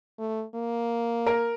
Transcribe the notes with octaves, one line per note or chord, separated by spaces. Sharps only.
A3
A#3
A#4